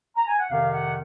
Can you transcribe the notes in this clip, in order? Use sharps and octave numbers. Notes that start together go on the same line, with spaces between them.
A#5
G#5
F#5
F2 C3 D#3 F5
F#5